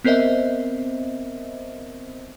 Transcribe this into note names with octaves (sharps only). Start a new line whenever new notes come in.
B3 C4 A#4 C5 D#5 E5